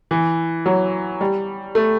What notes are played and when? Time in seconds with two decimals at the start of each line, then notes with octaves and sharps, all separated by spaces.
0.11 E3
0.66 F#3
1.21 G3
1.75 A3